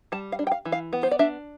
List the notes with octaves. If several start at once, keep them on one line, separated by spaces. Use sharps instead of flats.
G3 A5
F5
D4
G5
F5
E3
F5
B3
C5
D5
D4 E5